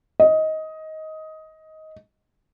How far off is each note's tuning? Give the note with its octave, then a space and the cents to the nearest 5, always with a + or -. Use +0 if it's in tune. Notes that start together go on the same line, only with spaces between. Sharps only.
D#5 +15